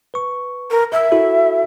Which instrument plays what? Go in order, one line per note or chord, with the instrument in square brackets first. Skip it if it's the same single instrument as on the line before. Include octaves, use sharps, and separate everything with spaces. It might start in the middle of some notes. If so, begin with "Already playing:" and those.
[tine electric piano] B4 C#6
[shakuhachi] A#4
[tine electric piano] A#4 E6 [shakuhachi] E5
[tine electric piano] E4 F#4 A4